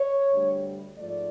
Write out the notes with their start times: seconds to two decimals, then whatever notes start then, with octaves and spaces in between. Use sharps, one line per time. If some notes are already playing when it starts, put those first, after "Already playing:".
Already playing: C#5
0.31 D2 D3 G3
0.96 G#2 F3 A3 D5